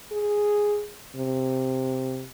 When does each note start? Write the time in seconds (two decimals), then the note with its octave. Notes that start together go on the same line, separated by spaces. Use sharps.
0.12 G#4
1.16 C3